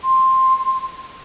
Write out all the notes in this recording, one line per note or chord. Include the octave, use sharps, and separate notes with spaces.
C6